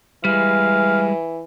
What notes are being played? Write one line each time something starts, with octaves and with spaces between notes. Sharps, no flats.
E3 G3 G#3 F5